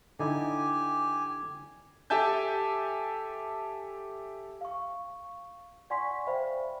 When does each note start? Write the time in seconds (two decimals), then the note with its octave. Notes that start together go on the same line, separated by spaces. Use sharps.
0.20 D3 D#4 E4 G4 G#5
2.10 G4 A4 E5 G#5 A5 G6
4.61 F5 C#6
5.90 D5 F#5 G#5 C6 C#6 B6
6.27 C5 D5 E5 F5 G5 B5